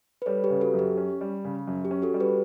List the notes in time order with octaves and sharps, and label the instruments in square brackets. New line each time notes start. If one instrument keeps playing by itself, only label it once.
[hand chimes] B4
[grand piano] G3 [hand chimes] A4 C#5
[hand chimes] G4 B4
[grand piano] C#3
[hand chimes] F#4 A4
[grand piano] F#2
[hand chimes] G4
[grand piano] C#4
G3
C#3
F#2
[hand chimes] G4
[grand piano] C#4
[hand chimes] F#4 A4
[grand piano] G3
[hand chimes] G4 B4